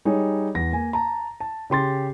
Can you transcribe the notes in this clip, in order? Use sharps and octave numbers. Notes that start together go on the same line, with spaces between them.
G3 D#4 G#4 C#5
E2 A#6
A#3 G#5
A5 A#5
A5
C#3 G4 C6 A6